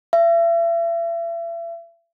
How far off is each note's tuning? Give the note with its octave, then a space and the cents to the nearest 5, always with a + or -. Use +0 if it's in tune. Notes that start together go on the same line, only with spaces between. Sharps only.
E5 +40